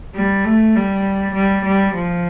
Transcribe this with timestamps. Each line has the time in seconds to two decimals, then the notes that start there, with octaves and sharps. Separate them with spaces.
0.15 G3
0.44 A3
0.76 G3
1.35 G3
1.65 G3
1.95 F3